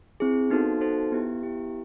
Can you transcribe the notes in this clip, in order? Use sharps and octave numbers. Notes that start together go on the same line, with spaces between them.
C4 E4 G#4
B3 D#4 F#4 A4 C5
B3 D#4 F#4 A4 C5
B3 E4 G4
B3 E4 G4